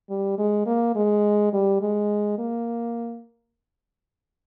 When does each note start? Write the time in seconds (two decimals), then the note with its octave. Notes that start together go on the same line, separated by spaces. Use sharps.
0.10 G3
0.38 G#3
0.66 A#3
0.96 G#3
1.53 G3
1.81 G#3
2.38 A#3